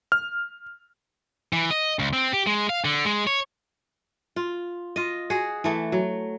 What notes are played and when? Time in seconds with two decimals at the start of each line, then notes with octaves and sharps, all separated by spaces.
0.12 F6
1.53 E3
1.71 D#5
1.99 C#2
2.13 C4
2.33 G4
2.47 G#3
2.69 F5
2.85 D3
3.05 G#3
3.27 C#5
4.36 F4
4.96 F4 D#5
5.30 F#4 G#4
5.64 E3 A3
5.92 F#3